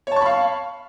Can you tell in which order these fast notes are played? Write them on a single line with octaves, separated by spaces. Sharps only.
C#5 A5 C#6 B5 F5